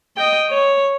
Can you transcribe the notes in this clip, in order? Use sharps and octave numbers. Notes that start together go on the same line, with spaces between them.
D#5 G5
C#5